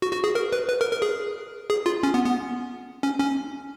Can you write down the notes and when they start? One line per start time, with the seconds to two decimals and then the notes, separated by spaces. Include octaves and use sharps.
0.02 F#4
0.13 F#4
0.24 G#4
0.35 A#4
0.52 B4
0.68 B4
0.81 A#4
0.92 A#4
1.02 G#4
1.70 G#4
1.86 F4
2.03 C#4
2.14 B3
2.25 B3
3.03 C#4
3.20 C#4